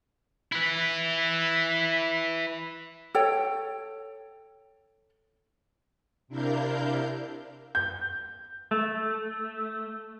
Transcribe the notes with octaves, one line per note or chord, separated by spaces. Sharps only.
E4 B4
A4 C#5 G5
C3 D4 E4 A#4 F5 G6
G6
A3